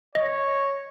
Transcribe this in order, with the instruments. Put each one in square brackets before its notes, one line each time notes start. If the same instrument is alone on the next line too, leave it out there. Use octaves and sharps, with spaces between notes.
[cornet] C#5 [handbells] D#5